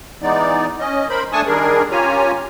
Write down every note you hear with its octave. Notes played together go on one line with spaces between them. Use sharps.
E3 G#3 B3 D#4 D5
C#4 D#5
A#4 C5 B5
A3 D4 G#5 A5 C#6 D#6
D#3 G3 D4 G#4 A#4
C#4 F4 G4 C#5 G#5 A#5